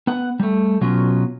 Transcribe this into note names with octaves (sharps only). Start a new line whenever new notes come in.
B3 F#5
G3 A3
B2 F#3 B3 C#4 F4